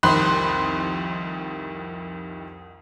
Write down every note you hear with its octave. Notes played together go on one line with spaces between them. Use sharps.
C2 F2 D#3 B5 C6 F#6